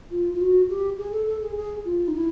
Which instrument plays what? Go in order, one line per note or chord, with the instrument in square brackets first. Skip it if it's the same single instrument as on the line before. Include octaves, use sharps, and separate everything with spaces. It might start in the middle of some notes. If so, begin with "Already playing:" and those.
[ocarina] F4
F4
F#4
G4
G#4
A4
A4
G#4
G#4
F4
D#4
E4